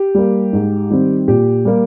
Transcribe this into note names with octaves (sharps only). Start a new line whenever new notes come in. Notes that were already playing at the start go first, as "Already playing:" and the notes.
Already playing: G4
G3 A#3
G#2
D#3 G3 C4
A#2 G4
G3 A#3